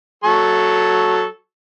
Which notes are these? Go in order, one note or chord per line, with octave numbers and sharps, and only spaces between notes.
F#3 A4 C#6